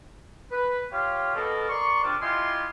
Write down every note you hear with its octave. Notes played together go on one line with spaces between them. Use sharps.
B4
F4 G4 C#5 F5
B2 A4 A#4
A#4 D5 C6 C#6
C3 D4 F4
E4 F4 G4 D#5 G#5 C6